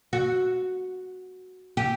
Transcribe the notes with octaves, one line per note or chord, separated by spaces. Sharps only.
F#4
G4